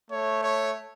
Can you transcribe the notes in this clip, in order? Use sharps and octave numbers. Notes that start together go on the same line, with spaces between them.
A3 C#5
C#5